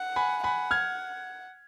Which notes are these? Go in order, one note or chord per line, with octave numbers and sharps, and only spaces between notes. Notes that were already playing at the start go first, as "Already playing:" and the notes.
Already playing: F#5
G#5 B5
F#5 G#5 B5
F6 G#6